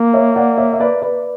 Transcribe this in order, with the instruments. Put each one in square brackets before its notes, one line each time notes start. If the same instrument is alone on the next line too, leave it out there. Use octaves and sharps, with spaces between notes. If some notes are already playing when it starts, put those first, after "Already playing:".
Already playing: [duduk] A#3
[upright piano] C#5 E5
D5 F#5
C#5 E5
E5
B4 D5
B4 D5